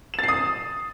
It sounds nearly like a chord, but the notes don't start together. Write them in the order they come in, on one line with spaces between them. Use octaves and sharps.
E7 A6 C7 D#6